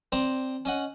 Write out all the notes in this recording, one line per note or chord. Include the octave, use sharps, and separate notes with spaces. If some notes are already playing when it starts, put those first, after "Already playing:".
C4 C5 D5 A#5
C#4 D#5 F#5